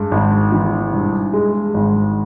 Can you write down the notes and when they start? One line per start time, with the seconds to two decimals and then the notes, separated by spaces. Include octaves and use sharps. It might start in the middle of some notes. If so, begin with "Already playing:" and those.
Already playing: G2 G#3
0.11 G#1
0.52 E3
0.93 G2
1.33 G#3
1.74 G#1